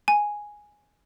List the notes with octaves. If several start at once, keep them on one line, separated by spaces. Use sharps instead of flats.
G#5